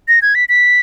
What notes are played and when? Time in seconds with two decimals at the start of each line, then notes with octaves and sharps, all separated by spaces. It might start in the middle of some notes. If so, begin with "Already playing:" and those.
0.08 A#6
0.22 G#6
0.35 B6
0.49 B6